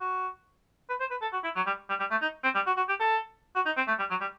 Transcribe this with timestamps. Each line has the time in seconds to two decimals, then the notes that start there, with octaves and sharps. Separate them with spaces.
0.01 F#4
0.90 B4
1.00 C5
1.11 B4
1.22 A4
1.33 F#4
1.44 E4
1.56 F#3
1.67 G3
1.89 G3
2.00 G3
2.11 A3
2.22 D#4
2.44 C4
2.55 G3
2.67 F#4
2.77 F#4
2.89 G4
3.00 A4
3.55 F#4
3.66 D#4
3.77 C4
3.88 A3
3.99 G3
4.10 F#3
4.21 G3